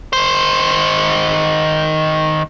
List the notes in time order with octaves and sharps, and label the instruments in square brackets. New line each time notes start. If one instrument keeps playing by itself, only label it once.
[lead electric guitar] D#3 C5